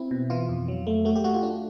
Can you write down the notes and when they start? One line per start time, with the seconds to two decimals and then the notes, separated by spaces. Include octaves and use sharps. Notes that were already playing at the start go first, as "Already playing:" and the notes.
Already playing: C4 E4
0.11 B2
0.30 E3 F4
0.49 F2
0.68 F#3
0.87 A3
1.05 A3 F#4
1.16 G4
1.24 A3 F#4
1.34 F4
1.43 D4